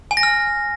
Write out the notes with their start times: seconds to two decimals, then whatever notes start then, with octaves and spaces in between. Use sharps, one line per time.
0.11 G#5
0.17 A#6
0.23 F6